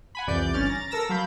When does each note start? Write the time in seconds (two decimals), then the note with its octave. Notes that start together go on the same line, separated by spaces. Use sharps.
0.15 F#5 G#5 B5
0.27 C2 F2 E3 D5 G6
0.53 G1 C#4 F6 A6
0.69 A#5 A6
0.91 A4 A#4 E6 A#6
1.09 F#3 F5 B5 G6